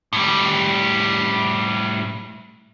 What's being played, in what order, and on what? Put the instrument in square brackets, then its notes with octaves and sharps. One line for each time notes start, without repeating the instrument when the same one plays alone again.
[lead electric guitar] A2 G3